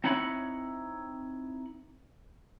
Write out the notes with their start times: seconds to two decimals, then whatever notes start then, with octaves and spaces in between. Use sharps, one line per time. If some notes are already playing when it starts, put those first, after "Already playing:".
0.04 C4 D#4 E4 C#5 F#5 B5